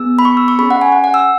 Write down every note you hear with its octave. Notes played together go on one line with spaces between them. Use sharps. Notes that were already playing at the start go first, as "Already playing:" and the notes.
Already playing: B3 G#4 E6
B5
C#6
E6
C#6
C#4 G#4 B5
F#5
G#5
F#5
F#5
E6